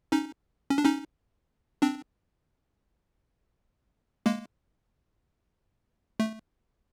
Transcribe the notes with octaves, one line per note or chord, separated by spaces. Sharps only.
C#4 D#4
C#4
D4
C#4 D#4
C4 D4
G#3 A#3
A3